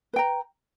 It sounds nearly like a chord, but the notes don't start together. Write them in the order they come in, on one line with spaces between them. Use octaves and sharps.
B4 G5 A#5